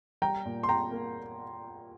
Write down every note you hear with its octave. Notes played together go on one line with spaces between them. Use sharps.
G3 G5 A#5
A#2
C6
A#2 G5 A#5
A#3